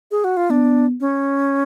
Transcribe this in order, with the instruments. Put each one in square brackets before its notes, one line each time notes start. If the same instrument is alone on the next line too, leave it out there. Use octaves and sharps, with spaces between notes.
[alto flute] G#4
F#4
F4
[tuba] B3 [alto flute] D4
[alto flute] C#4